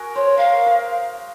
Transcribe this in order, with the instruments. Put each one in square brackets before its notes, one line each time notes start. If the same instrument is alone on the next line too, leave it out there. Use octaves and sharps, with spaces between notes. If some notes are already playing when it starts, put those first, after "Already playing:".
Already playing: [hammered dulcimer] F#4 G#4 A#4
[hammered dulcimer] C5 [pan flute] C#5
[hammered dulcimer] A#4 [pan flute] F5
[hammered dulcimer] A#4